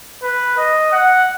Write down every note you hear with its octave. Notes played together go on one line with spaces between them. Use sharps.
B4
D#5
F#5